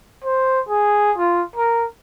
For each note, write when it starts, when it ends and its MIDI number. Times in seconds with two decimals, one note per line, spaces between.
0.24 0.60 72
0.69 1.12 68
1.17 1.42 65
1.56 1.84 70